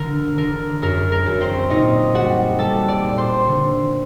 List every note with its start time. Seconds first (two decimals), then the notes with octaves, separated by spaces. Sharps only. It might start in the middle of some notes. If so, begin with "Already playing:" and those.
Already playing: D3 A#4
0.38 D3 A#4
0.82 F#2 A#4
1.12 A#4
1.26 F#2
1.41 C4 C5
1.70 A#2 D#4 D#5
2.14 G3 F#4 F#5
2.59 G3 A4 A5
2.88 D5 D6
3.03 A#2
3.18 C5 C6
3.48 D3